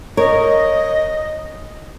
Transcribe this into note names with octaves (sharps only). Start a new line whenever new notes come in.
A#4 C#5 D#5